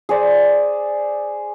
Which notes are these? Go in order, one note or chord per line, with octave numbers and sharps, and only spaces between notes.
G#4 C5 D5